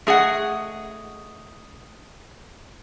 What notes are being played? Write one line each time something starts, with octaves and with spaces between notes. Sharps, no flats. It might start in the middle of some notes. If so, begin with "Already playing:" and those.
A3 G#4 D#5 F#5